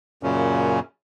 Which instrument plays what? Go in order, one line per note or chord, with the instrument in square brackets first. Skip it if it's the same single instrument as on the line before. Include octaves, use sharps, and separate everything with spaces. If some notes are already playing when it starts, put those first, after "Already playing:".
[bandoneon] F#2 A#2 C#3 C#4